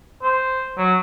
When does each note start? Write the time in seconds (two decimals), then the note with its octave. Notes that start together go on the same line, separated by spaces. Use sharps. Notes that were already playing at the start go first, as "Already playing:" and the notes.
0.23 C5
0.78 F#3